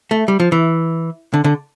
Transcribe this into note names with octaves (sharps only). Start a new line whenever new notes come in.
A3
G3
F3
E3
D3
D3